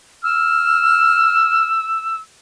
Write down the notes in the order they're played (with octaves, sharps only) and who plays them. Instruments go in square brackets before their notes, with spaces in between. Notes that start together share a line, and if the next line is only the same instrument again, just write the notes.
[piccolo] E6 [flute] F6